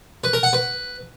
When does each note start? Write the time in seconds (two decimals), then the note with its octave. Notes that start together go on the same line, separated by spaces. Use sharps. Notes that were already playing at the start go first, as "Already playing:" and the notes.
0.24 B4
0.33 A#4
0.43 F#5
0.53 B4